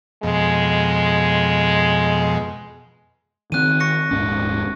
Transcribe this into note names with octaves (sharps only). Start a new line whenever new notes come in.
F2 B2 G#3
D#3 C4 F#6 D#7
C#6 A#6 C#7
D#1 G#2 C#4